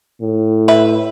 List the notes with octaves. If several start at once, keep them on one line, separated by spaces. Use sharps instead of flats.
A2
B4 E5